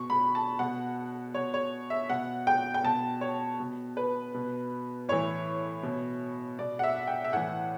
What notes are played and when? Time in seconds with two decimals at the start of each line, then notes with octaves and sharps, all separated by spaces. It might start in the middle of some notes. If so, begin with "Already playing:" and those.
Already playing: B2 C#6
0.10 B5
0.35 A5
0.59 B2 F#5
1.34 B2 C#5
1.54 C#5
1.90 E5
2.09 B2 F#5
2.47 G5
2.74 G5
2.84 B2 A5
3.21 C#5
3.60 B2
3.97 B4
4.34 B2
5.08 A2 E3 C#5
5.83 B2
6.59 B2 D5
6.79 F#5
6.83 E5
7.07 G5
7.24 E5
7.32 A2 E3 F#5